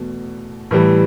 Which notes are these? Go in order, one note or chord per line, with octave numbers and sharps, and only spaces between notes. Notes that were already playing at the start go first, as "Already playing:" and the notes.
Already playing: E2 B2 A3
A2 E3 G3